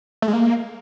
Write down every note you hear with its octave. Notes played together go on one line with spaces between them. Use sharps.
A3
G#3
A#3